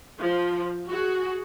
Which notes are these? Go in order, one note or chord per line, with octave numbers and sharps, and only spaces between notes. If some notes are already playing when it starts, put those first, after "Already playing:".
F3
F#4 G#4